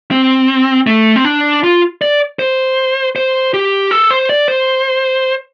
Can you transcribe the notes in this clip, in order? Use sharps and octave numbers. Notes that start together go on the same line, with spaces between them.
C4
A3
C4
D4
F4
D5
C5
C5
G4
A4
C5
D5
C5